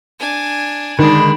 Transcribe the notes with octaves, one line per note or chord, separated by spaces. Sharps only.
D4 G#5
D3 D#3 G#3 D4 B5